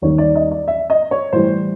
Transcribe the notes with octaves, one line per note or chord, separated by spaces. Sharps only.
D#2 D#3 G3 C#5
D5
D#5
D5
E5
D#5
C#5
A2 E3 G3 C5